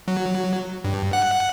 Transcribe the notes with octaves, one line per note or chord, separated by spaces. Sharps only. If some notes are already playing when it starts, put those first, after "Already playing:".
F#3
G2
F#5